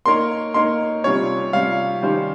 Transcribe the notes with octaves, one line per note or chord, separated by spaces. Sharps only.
A#3 D#4 A#4 C#5 C6
A#3 D#4 A#4 C#5 C6
C3 G3 C#4 F4 C#5
C3 G3 C#4 F4 F5
D#3 G3 C#4 G4 C5